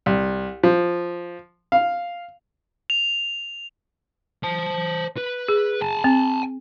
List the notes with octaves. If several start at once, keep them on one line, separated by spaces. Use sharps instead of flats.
C2
F3
F5
F7
C5 A5
B4
G#4
G#5 A5
C4